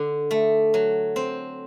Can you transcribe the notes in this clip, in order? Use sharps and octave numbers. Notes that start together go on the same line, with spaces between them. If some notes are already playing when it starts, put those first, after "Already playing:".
Already playing: D3
A3
F#3
C4